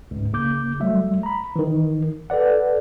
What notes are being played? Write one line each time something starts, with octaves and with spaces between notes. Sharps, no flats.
C#2 G#2
C#3 A#3 D6 G6
F#3 G3 A3 E5
A#5 B5
D#3 E3
A4 B4 D5 F#5